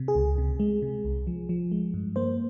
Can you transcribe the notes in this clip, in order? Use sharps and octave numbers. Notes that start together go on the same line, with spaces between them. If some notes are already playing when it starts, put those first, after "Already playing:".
Already playing: C3
G#4
C#2
C3
G#3
C3
C2
F3
F3
G#3
G2
A#3 C5